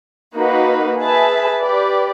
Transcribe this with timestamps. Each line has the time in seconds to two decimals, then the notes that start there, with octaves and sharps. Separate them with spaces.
0.36 A#3 D#4 F#4 B4
0.99 G#4 B4 E5 A5
1.63 G4 B4 D5